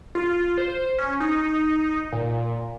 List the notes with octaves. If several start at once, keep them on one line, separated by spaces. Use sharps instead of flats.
F4
C5
C#4
D#4
A#2